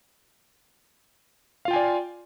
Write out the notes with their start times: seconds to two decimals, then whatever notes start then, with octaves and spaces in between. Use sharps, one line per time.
1.65 F5
1.68 F4
1.71 G5
1.73 G#5
1.76 D5